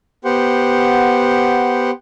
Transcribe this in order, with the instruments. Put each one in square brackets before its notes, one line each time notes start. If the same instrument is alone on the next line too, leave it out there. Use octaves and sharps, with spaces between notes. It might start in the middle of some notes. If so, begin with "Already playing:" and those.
[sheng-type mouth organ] B3 G4 C5 F#5